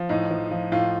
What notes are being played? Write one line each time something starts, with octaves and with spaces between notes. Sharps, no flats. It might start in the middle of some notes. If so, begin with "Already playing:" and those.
Already playing: F3
A2 D#4
F3
F3
A2 F4